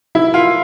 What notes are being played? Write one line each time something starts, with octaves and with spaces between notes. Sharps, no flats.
E4
F4